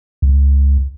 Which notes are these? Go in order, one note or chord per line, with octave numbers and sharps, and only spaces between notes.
C#2